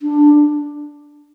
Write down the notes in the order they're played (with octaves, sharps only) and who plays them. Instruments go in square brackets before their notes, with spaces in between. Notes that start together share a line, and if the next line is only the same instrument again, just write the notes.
[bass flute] D4